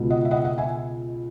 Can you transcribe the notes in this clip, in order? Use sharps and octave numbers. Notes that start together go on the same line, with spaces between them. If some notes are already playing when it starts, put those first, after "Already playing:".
Already playing: C#2 B2
D#5 F#5
E5
D#5 F#5
D#5 F#5
E5 G#5